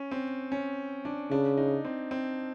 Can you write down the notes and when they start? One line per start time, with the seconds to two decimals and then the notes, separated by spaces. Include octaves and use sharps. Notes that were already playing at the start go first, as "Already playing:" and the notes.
Already playing: C#4
0.11 C4
0.52 C#4
1.05 D4
1.31 C#3 D4
1.57 D#4
1.85 C4
2.11 C4